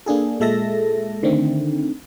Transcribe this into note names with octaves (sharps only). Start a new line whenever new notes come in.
A#3 D4 G#4 A4
A#2 G#3 A4 E5 A5 A#6
D3 D#3 A3 C4